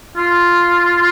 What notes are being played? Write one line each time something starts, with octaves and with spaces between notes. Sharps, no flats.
F4